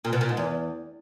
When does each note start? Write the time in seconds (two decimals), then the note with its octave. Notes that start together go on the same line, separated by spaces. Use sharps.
0.05 A#2
0.13 B2
0.21 A#2
0.29 G#2
0.37 E2